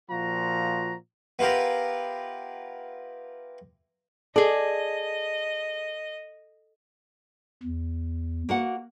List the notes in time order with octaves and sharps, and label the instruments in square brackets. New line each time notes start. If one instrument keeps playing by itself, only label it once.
[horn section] A#2 F3 F4 F#4 A#5
[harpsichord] B3 E4 F4 G4 A#4
[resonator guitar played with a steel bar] G#4 D5 [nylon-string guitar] A4 [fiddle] D#5
[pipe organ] E2
[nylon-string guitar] A#3 F#4 F#5